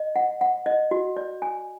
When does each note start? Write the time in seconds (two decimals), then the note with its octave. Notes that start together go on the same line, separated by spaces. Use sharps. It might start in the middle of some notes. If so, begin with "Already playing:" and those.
Already playing: D#5
0.16 F#5
0.41 F#5
0.66 D#5
0.91 F#4
1.17 D5
1.42 G#5